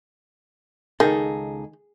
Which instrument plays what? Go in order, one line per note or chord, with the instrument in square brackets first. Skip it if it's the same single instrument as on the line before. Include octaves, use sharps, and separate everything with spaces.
[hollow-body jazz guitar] C#2 D#4 A4 [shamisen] D#3 [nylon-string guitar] G#4